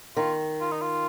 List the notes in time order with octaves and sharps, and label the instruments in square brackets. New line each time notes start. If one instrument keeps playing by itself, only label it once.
[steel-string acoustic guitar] D#3 [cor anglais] F4
[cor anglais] F4
D#4
F4